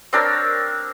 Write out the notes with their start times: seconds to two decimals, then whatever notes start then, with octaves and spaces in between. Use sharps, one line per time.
0.13 C4 D4 A#4 C#5